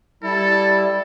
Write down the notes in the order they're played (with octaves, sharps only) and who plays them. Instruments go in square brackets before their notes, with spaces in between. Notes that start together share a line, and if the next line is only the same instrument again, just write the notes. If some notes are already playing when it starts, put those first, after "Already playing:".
[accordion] G3 E4 [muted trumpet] A4